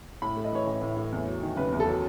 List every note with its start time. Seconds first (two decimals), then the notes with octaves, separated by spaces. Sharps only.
0.22 A2 B5
0.36 A3
0.45 D#5
0.52 E3 C#5
0.67 A1
0.81 A2
0.96 A3
1.12 E2
1.26 F#3
1.42 D#3
1.56 F#1 B4
1.72 E2
1.80 A4
1.87 F#3